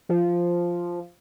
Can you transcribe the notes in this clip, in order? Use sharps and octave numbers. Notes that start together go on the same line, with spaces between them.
F3